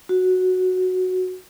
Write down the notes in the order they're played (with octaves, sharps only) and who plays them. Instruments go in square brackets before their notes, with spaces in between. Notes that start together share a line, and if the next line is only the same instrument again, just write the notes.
[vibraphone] F#4